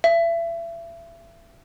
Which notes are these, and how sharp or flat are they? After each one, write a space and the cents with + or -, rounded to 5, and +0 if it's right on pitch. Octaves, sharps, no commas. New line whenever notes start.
E5 +35